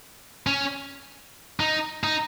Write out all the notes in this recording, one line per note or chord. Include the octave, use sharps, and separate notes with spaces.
C#4
D#4
D#4